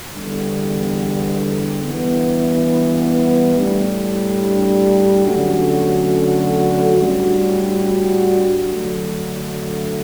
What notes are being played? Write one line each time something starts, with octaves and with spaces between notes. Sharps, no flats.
E2 D3 G3
G2 E3 B3
A2 G3 D4
D3 F#3 A3 C#4 F#4
A2 G3 D4 F#4
D3 F#3 A3 D4